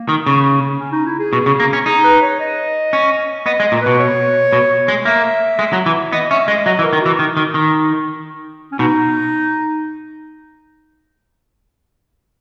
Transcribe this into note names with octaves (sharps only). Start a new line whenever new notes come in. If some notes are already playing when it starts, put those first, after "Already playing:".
Already playing: A#3
D#3
C#3
C#4
D#4
E4
G#4
B2
C#3
A#3
C#4
D#4 G#4
B4
C#5
D#5
C#4
B3 D#5
G#3
D#5
A#2
B2 B4
C#5
B2
G#3
A#3 E5
G#3
F#3
E3
B3 D#5
C#4 E5
G#3 D#5
F#3 D#5
E3
A#4
D#3
E3 F#4
D#3
D#3
D#3
C#4
B2 D#4